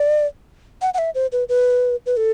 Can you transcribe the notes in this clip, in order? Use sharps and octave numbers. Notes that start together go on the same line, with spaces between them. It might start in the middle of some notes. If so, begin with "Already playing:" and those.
Already playing: D5
F#5
F#5
E5
C5
B4
B4
B4
A4